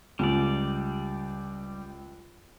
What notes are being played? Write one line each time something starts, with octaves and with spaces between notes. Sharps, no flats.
C#2 G3 D5